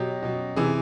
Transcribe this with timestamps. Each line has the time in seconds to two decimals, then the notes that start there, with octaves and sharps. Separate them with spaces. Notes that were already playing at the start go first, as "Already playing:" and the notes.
Already playing: B2 F#3 G4
0.22 B2 F#3
0.56 C3 E3 G#4